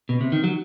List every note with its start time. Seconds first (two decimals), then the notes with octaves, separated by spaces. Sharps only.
0.09 B2
0.21 C3
0.32 D#3
0.44 F#3